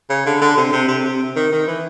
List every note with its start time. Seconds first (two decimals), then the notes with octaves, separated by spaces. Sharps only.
0.10 C#3
0.26 D3
0.42 D3
0.57 C3
0.72 C3
0.88 C3
1.04 C3
1.36 D#3
1.52 D#3
1.67 E3